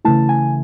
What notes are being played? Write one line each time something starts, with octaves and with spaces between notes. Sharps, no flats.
C#3 E3 A3 E4 A5
G#5